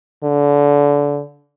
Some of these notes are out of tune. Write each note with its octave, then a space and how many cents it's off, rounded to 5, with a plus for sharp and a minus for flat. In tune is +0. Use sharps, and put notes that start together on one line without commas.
D3 -25